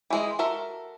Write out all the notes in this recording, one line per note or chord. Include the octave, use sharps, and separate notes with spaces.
E3 G#3 D#5
F#4 A4 A#4 E5